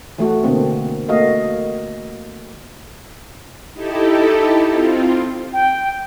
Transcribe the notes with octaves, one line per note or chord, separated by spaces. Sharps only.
E3 A3 F#4
B2 D3 A#3 C4
A3 A#3 F#4 D#5 F5
D#4 E4 G4 A4
C4 F4
G5